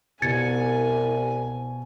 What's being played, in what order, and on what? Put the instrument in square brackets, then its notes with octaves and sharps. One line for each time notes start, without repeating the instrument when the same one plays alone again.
[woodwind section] C2 [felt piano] B2 [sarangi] G#5 [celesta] G#6 A6 C#7